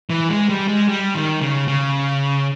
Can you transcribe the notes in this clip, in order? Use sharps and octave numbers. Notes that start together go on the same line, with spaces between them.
E3
G#3
G3
G#3
G3
D#3
C#3
C#3